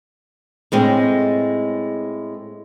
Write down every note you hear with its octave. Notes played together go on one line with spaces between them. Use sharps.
A2 G#3 C4 C#4